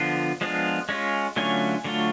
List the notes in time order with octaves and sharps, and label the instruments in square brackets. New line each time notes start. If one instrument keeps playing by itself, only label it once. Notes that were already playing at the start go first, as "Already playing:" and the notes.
Already playing: [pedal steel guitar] D3 F3 B3 F4
F3 G#3 B3 D4 F4
G#3 C#4 F4
D3 F#3 A3 C#4 F4 G#5
D3 F#3 A3 F4